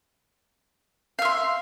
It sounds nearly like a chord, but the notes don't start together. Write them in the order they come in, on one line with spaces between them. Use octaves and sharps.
F5 E5 C6